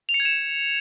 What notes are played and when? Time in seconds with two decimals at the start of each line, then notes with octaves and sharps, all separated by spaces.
0.09 F7
0.14 C#7
0.20 G#6
0.25 E7